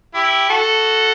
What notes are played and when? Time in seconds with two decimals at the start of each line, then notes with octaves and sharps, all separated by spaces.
0.14 E4 G4
0.49 F#4 A4